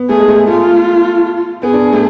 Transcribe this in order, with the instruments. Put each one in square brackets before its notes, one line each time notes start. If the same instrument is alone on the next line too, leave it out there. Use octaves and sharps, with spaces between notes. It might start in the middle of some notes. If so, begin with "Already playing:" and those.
Already playing: [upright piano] B3
[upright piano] A3 [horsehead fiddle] G#4
[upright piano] G#3
A3
[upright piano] A3 [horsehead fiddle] F4
[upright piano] B3 [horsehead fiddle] G#4
[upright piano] D4
A3